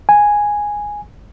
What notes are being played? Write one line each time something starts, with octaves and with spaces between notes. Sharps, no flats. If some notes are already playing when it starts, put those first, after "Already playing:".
G#5